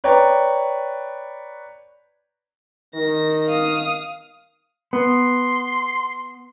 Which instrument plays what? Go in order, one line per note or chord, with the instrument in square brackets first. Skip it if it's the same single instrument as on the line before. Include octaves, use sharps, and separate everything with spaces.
[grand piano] B4 C#5 D5 G5 A#5
[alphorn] D#3 [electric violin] A#6
[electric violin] F5 D#6
[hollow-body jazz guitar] B3 [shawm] C6